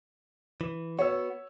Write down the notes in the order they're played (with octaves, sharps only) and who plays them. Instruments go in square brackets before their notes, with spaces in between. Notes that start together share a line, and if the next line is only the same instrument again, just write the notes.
[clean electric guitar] E3
[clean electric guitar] B3 F#4 [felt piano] C#5 E6